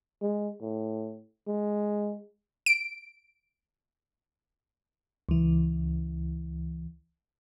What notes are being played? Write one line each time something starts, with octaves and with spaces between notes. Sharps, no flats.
G#3
A2
G#3
D7
C#2 E3